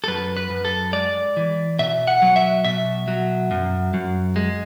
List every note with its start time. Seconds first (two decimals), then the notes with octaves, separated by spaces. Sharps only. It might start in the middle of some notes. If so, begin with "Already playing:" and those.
0.04 A4
0.07 F#2 B4
0.37 B4
0.50 F#2
0.65 A4
0.93 G#3 D5
1.37 E3
1.79 B2 E5
2.07 F#5
2.22 F#3
2.36 E5
2.65 B2 E5
3.08 F#3
3.51 F#2
3.94 F#2
4.36 G#3